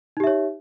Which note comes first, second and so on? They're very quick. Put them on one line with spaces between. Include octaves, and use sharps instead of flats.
D#4 G4 E5 C#5